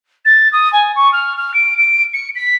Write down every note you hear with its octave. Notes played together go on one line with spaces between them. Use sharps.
A6
D#6
G#5
C#6
F6
F6
D7
D7
C#7
B6